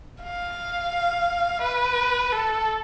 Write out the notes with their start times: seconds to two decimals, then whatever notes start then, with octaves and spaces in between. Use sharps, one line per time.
0.23 F5
1.62 B4
2.32 A4